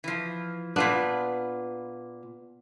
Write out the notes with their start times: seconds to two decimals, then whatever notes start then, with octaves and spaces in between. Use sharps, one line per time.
0.04 E3 F3
0.76 A#2 B3 D4 F4 B4